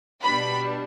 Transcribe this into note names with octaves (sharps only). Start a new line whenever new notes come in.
B2 G3 D4 B5